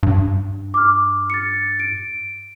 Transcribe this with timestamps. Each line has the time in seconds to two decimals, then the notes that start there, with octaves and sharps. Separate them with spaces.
0.03 G2
0.74 D6 F6
1.30 A6 C#7
1.79 D7